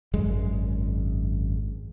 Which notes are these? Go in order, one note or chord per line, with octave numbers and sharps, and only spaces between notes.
G#1 F#2 G#3